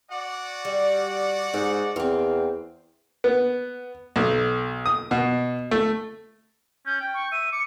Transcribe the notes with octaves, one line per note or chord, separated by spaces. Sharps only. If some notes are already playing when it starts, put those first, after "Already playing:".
F#4 D5 F#5
G3
G#2 D#4
E2 C4 A#4
B3
B1
D#6
B2
A3
C#4 G6
G5
C#6
E5 D#7
D6 C#7